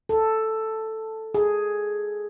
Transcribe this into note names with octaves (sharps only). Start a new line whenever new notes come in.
A4
G#4